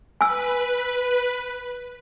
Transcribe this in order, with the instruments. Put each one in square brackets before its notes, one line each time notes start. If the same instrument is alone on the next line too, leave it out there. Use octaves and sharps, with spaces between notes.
[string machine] B4 [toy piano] G#5 E6